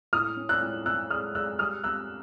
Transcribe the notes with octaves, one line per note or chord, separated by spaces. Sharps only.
A2 D#6 F6
C#4
E6 F#6
A2
A2 E6 F#6
G#3 D#6 F6
G#3 E6 F#6
G3 D#6 F6
G3 E6 F#6